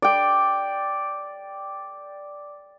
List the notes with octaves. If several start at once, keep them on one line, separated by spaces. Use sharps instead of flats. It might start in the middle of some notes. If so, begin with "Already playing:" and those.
D5 G5